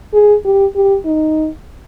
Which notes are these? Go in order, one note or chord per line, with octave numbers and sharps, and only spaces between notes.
G#4
G4
G4
D#4